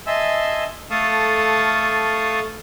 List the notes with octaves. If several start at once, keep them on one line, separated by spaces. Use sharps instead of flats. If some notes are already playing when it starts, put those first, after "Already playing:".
D#5 E5 G#5 A5 C6 E6
A3 A4 F5 A5 C#6 D#6